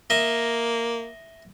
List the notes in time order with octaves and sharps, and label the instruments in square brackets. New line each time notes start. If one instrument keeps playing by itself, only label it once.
[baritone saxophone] A#3 [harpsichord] D#5 E5